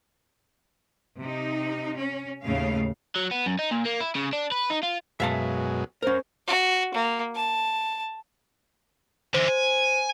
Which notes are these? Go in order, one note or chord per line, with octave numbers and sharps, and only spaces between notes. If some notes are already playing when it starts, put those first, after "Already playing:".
C3 D#4
C#4
D#2 A2 C#3 A3 F5
F#3
B3
F#2
D#4
A#2
A#3
E4
C#3
D4
B4
D#4
F4
F#2 B2 G#3 E5 F5 A5
C#4 A#4 C5
F#4
A#3
A5
D3 E3 C5
G#5